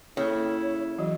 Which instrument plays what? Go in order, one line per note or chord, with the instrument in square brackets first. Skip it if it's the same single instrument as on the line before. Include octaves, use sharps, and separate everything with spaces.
[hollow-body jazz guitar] C#3 [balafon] A#3 A4 [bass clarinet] E4 [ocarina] C#5
[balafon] E3 F#3 F#4